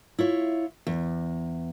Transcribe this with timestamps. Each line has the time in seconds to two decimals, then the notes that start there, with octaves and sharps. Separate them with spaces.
0.19 E4 F4 C#5
0.87 E2